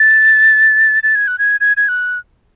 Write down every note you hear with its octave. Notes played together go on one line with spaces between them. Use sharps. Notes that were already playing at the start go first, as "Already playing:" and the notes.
Already playing: A6
A6
G#6
F#6
G#6
G#6
G#6
F#6